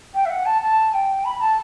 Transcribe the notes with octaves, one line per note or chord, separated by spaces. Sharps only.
G5
E5
F#5
A5
A5
G5
B5
A5